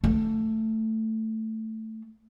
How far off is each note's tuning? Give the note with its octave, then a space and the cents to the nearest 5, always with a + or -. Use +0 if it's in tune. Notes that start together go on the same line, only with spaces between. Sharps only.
A3 +5